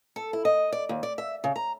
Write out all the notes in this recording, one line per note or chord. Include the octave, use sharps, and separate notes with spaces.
A4
E4
D#5
D5
D#2
D5
E5
C#3
A#5